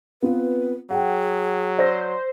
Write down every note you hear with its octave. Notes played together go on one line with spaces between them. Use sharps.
B3 C4 F4 B4
F#3 G#4 F#5 G5
C5 D5 E6 A#6